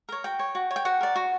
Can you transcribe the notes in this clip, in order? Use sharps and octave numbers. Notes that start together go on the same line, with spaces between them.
A#4 C#5
F#4 G5
C#5
F#4
C#5
G5
F#4 F#5
A#4 D5
F#4